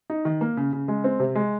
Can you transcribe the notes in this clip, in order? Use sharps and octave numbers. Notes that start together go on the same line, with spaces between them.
D#4
D#3
A#3
C#3
C#3
G#3
C4
C3
G#3